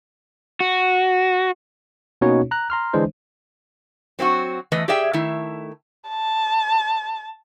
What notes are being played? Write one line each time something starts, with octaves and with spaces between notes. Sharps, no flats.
F#4
B2 A#3 C#4 D#4 F#4 C#5
A#5 F#6
A#5 C6 F6
D3 E3 G#3 D4 C5
F#3 C4 E4 F#4
E2 E3 A3 B4 D#5
G4 G#4 D5 E5 G5
D#3 A3 E4
A5